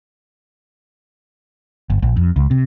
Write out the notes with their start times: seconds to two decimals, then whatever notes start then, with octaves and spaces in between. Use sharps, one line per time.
1.90 G1
2.02 A#1
2.17 F2
2.36 C#2
2.51 C3